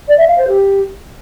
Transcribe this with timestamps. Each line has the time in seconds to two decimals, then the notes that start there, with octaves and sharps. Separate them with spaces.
0.08 D5
0.18 E5
0.28 F5
0.38 C5
0.48 G4